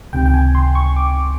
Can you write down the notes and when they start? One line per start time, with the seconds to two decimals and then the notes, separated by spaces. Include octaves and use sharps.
0.13 C#2 C3 D#3 G5
0.26 G5
0.34 G#5
0.55 C6
0.75 C#6
0.96 D6